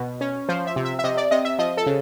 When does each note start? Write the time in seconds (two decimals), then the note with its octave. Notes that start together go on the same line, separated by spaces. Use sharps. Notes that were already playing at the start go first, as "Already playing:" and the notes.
Already playing: B2 B4
0.21 C#4
0.49 F3 C5
0.67 E5
0.76 C3
0.85 E5
0.99 E5
1.04 C3 D#5
1.17 D5
1.31 C3 D#5
1.45 E5
1.59 F3 D#5
1.77 A4
1.86 C#3